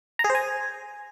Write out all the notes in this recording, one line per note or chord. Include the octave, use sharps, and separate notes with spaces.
A#5
G#4
C5
G#5